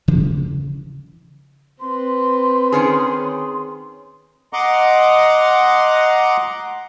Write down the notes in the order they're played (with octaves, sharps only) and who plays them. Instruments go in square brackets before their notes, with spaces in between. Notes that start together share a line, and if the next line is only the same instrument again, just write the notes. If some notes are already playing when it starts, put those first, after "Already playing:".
[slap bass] C#3 E3 F3
[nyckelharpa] C4 B4 [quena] C6
[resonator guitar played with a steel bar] D#3 C#4 G#4
[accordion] D#5 F#5 A#5 C6 D6